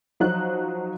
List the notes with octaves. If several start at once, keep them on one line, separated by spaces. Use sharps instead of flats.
F3 F#3 D#4 F#4 C5 F#6